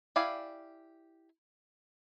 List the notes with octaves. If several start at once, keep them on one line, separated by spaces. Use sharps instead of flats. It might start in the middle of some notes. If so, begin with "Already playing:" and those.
E4 G4 D5 F5 G#5